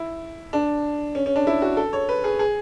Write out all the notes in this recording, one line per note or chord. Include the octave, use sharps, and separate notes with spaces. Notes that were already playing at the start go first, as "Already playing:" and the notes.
Already playing: E4
D4
C#4
C#4
D4
E4
F#4
A4
C#5
B4
G#4
G#4